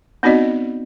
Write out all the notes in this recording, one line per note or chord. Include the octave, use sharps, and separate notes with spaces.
B3 C4 D#4 F#4 D5 D#5